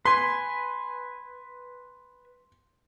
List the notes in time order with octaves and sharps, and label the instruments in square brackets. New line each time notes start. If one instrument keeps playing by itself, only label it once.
[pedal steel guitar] B4 G#5 [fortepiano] C6